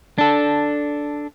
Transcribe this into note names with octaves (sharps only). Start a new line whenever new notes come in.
D4 A4